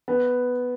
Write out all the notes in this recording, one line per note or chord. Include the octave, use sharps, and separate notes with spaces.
B3